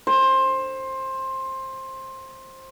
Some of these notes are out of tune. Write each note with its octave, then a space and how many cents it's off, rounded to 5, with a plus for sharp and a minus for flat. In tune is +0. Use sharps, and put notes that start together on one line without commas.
C5 +15 C#6 +5